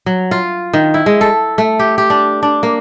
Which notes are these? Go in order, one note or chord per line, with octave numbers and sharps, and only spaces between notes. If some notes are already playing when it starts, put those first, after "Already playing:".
F#3
F4
D#3
E4
G#3
A4
A3
G4
G4
D4
D4
A#3